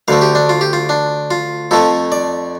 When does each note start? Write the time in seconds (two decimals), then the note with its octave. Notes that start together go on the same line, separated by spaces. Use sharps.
0.08 D2 D3 A3 F5
0.22 G4
0.35 D4
0.49 F4
0.61 G4
0.73 F4
0.89 D4
1.31 F4
1.71 F2 F3 A3 A4
2.12 D5